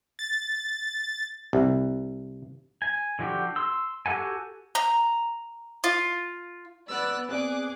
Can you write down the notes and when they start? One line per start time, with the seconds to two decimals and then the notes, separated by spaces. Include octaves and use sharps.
0.19 A6
1.53 C2
2.82 G#5
3.19 D3 F3 F#4 G4
3.56 C6 E6
4.06 F#4 G4 A4 F#5 G#5
4.75 A#5
5.84 F4
6.89 B3 D5 E6 F#6
7.29 B3 C4 G#4 D5 D6 F#6